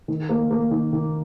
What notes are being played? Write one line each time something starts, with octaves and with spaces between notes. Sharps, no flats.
D#3
A#3
A#3
D#3
D#3